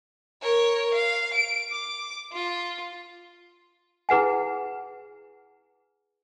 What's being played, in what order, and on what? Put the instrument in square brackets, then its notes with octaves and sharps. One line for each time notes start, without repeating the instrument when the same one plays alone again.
[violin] A#4 C#5
F5
D7
D6
F4
[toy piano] E4 G#4 B4 F#5 G#5